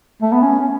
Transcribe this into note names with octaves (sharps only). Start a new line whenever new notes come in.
A3
B3
C#4
C#4